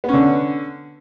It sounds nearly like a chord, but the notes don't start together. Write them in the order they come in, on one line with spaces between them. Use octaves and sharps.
B3 C#4 D3